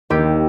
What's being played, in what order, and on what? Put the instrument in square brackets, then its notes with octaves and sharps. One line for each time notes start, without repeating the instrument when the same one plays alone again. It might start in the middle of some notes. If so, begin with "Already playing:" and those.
[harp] D#2 G4